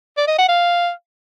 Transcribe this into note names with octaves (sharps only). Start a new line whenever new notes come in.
D5
D#5
F#5
F5